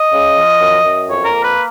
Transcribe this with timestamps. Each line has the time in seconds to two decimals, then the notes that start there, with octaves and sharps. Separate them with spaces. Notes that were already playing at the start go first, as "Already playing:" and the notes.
Already playing: D#5
0.13 C#3
0.37 F3
0.60 F#2
0.84 F#2
1.08 F2 C#5
1.25 A#4
1.31 A#3
1.44 B4